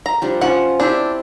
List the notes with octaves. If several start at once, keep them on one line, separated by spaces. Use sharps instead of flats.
A#5
F3 G3 D4
F3 C#4 F#5
C4 D4 E4 G4